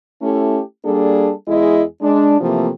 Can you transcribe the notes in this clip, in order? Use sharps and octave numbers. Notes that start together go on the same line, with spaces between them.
A3 C#4 E4 G4 A4
G3 A#3 D4 G#4 A4
E2 G#3 E4 G#4 D#5
G#3 D4
C3 E3 F3 A3 A#3